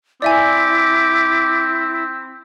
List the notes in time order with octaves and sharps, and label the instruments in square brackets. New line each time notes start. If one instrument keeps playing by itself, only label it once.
[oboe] C4 [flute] E4 [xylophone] D5 E5 G#5 [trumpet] D6